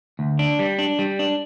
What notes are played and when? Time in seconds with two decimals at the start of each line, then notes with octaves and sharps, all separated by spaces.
0.19 D2
0.39 D4
0.59 G3
0.79 D4
0.99 G3
1.19 D4